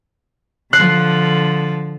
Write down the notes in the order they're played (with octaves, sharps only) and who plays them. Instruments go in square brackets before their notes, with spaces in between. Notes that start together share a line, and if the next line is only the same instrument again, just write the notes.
[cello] D3 F3 [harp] F#6 C7